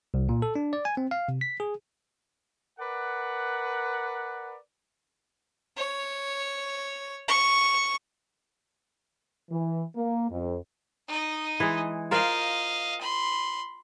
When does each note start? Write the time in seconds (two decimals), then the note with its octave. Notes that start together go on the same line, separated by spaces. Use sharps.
0.14 C2
0.29 A#2
0.42 A4
0.56 D4
0.73 D5
0.85 G#5
0.97 C4
1.11 F5
1.28 C3
1.41 B6
1.60 G#4
2.79 A#4 B4 D5 F#5
5.77 C#5
7.28 C#6
9.51 E3
9.96 A#3
10.31 F2
11.08 D#4 D#5
11.60 E3 G#3
12.11 F4 A#4 C5 D#5 F5
13.01 B5 C6